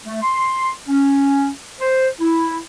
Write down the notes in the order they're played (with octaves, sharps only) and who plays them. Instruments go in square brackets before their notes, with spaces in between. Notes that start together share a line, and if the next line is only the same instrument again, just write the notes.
[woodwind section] A3
C6
C#4
C5
E4